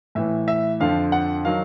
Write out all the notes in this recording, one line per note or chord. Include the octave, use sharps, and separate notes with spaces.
A2 E3 E5
E5
F2 D3 F3 F5
F#5
D#3 F#3 F5